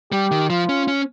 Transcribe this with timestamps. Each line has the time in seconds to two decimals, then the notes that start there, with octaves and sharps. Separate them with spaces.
0.12 G3 G4
0.32 D#3
0.50 F3 F4
0.69 C#4
0.88 C#4